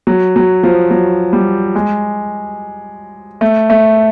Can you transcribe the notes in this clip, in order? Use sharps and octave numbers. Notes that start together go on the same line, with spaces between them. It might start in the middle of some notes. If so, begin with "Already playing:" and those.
F#3
F#3
F3
F#3
G3
G#3
A3
A3